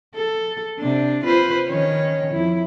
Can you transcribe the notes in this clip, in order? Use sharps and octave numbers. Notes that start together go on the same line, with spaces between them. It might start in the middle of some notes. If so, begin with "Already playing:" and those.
A4
C3 D4
F4 B4 C5
D#3 C#4 C#5
F2 E4